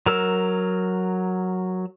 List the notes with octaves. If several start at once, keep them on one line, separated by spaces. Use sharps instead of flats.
F#3 A#4 E6